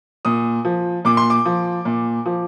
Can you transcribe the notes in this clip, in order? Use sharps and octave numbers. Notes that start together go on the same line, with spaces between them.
A#2 D#6
F3
A#2 D6
C6
D6
F3
A#2
F3